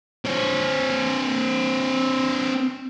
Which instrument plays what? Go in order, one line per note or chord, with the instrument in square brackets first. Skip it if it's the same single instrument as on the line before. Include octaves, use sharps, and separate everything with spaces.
[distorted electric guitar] C4 C#5